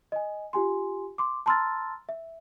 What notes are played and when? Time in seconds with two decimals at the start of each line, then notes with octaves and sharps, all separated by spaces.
0.12 D#5 G#5
0.53 F4 G4 G#5 C6
1.18 C6 D6
1.46 A5 A#5 C6 E6 F6 A6
2.09 E5